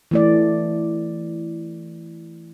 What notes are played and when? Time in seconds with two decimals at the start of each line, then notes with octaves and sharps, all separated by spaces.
0.11 E3 A3 D5